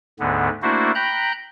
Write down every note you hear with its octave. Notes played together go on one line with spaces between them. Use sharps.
D2 G#2 D3 B3
A3 A#3 D4 E4 F#4 C5
G5 A#5 B5 F#6 G6